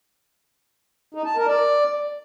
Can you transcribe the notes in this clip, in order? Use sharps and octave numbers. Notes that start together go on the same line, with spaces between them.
D#4
A5
A#4
D5